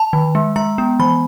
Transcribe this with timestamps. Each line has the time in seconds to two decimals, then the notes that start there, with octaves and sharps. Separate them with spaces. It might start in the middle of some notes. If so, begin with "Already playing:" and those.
Already playing: A5
0.13 D#3
0.35 G#3
0.56 G#3 A#5
0.78 B3
1.00 E3 B5